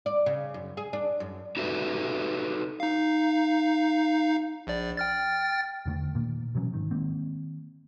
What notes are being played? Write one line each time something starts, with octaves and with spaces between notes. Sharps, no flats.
D5
C#3
F#2
G#4
D4
F#2
D#4 F#4 G4 A4 B4 E5
D#4 F5
A#1 D5
G5 F6 A6
E2 D3 A3
A#2 D#3 A#3
B2 E3 F#3 C#4
G#1 D#3
D#3 G#3 A#3 C4